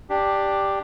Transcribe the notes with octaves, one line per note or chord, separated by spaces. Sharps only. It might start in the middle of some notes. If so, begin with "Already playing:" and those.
D4 G4